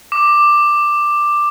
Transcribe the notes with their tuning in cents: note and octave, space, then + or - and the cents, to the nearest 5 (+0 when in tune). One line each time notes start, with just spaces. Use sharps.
D6 +10